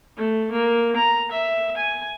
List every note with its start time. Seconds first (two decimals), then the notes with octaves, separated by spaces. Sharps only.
0.17 A3
0.52 A#3
0.96 A#5
1.31 E5
1.77 G#5